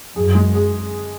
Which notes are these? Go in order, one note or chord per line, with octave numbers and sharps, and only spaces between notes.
F#2 G#4
G#3
G#4